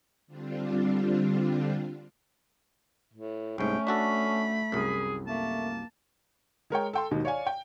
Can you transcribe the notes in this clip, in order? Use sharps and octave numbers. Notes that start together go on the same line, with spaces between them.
D3 G3 C4 D4 F4
A2
C2 G#2 A3 C#4 G5
D4 F#4 A4 B5
C2 F#2 G#4
A3 A#3 A5
G#3 A#4 C#5 G5
A4 G5 C6
D#2 G#2 B2 D#3
C#5 D5 F5 G#5
G5